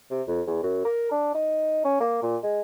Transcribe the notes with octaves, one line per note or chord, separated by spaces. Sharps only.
C3
F2
E2
F#2
A#4
D4
D#4
C#4
A#3
A#2
G#3